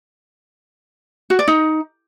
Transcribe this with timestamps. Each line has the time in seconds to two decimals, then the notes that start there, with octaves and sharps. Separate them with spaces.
1.30 F#4
1.39 D5
1.48 D#4